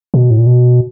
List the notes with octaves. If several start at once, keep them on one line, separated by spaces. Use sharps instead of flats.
B2
A2
A#2
B2